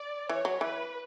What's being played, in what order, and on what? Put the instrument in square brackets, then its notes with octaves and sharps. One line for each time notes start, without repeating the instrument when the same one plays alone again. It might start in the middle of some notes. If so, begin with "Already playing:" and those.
Already playing: [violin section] D5
[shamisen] E3 [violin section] C#5
[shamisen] F#3
[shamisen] E3 [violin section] B4